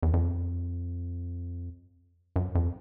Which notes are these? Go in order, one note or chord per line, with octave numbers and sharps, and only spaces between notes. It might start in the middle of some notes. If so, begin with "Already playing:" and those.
E2
F2
F#2
F2